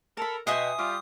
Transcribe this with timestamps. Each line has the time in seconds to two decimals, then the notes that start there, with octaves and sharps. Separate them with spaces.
0.17 A4 A#4 A5 B5
0.47 B2 D#5 E5 G5 G#5 C6 D#6
0.79 G3 F4 D6